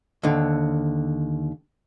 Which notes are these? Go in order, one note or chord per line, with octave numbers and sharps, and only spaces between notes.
D#2 D3